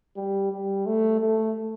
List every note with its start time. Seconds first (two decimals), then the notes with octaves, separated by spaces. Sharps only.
0.16 G3
0.52 G3
0.86 A3
1.21 A3